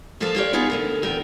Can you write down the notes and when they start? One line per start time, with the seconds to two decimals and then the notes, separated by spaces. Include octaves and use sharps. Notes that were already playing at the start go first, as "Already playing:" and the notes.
0.20 F2 F3 A#3 A4 F5 A5
0.36 F4 G4 A#4 C#5 D5
0.53 B3 D#4 F4 G#4 B4
0.70 D2 D3 A#4
1.03 A#2 E3 B3 A#4 G5